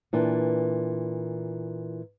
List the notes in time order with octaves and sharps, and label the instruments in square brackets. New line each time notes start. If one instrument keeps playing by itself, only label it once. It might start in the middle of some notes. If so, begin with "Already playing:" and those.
[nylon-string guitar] A#2 E3 D4